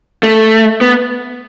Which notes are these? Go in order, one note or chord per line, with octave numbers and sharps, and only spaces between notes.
A3
B3